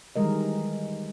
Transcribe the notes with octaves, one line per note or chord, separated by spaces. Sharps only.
D#3 E3 G3 G#3 A#4 D#5